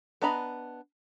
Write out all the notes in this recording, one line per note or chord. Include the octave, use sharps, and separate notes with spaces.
B3 D4 D#5 A#5 B5